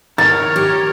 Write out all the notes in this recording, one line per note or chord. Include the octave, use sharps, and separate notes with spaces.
D#3 A#4 C#5 A6
G4